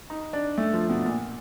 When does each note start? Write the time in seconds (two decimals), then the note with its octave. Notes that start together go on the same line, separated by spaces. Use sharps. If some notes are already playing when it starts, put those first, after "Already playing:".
0.10 D#4
0.33 D4
0.58 A3
0.73 F3
0.89 B2
1.06 A#2